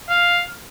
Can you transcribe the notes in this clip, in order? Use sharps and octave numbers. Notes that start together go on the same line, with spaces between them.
F5